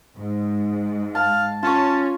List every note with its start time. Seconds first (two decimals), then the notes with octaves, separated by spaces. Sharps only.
0.17 G#2
1.15 F5 A5
1.63 C#4 F4 A5 C#6